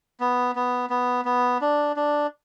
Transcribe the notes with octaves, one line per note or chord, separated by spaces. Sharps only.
B3
B3
B3
B3
D4
D4